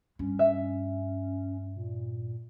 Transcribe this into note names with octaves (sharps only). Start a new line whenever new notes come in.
G2 C#4
E5
A#2